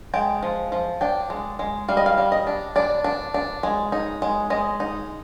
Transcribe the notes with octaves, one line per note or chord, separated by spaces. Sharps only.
G#3 G5
F3
F3
D4 G5
G#3
G#3
G3 F5
D#5
F5
G3
D#5
D4
D4 D5
D4
D4
G#3
D#4
G#3
G#3 D#5
D#4